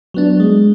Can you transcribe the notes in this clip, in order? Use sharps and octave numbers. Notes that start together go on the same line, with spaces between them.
F#3 B3 D4
G#3